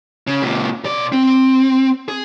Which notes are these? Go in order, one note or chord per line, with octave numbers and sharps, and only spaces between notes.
C#3
C#2 A#2
B2 D5
C4
G#4